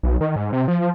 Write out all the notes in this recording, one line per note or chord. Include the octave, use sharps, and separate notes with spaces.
B1
D#3
G#2
C3
F3